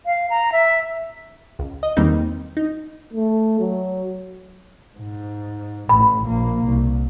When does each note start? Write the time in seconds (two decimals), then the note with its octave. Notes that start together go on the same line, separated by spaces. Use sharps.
0.06 F5
0.30 A#5
0.52 E5
1.59 C#2
1.83 D#5
1.97 E2 D#3 G3 A#3 C4 D#4
2.57 D#4
3.13 A3
3.60 F#3
4.98 G#2
5.89 A1 A2 B5
6.26 A#1 A#3
6.66 C2